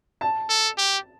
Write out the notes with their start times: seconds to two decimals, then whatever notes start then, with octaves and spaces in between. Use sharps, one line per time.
0.21 A5
0.49 A4
0.78 G4